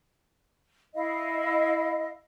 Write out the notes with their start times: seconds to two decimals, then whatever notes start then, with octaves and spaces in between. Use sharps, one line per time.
0.95 E4 D#5 F5